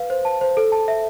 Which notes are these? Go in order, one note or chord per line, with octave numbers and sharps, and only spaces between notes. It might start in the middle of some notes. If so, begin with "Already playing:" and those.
Already playing: B4 F5
C5
A5
C5
A4
A5
E5